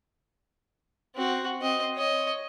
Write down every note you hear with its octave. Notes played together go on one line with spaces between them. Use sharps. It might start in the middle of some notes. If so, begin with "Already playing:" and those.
C4 F#4
C4 D#5
C#5 D#5